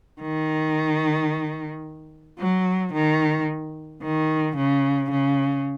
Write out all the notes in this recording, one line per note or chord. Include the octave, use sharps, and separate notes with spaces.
D#3
F#3
D#3
D#3
C#3
C#3